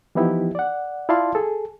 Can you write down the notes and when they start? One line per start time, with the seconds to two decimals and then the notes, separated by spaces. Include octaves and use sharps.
0.15 E3 F3 B3 D#4 E4 G4
0.55 D5 F#5
1.09 E4 F4 D5 F5 A5 C6
1.35 G#4 A4